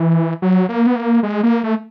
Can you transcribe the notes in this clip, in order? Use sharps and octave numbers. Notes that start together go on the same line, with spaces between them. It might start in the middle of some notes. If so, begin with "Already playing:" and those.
Already playing: E3
F#3
A#3
B3
A#3
G#3
A#3
A3